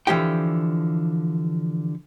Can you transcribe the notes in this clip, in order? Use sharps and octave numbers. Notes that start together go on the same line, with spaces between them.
D3 E3 F3 G4 G5